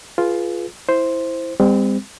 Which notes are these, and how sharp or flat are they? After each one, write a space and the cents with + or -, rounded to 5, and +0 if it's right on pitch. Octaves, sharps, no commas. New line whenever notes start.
F4 +0 G#4 +20 B4 -10
E4 +0 C5 +0
G3 +40 C4 -30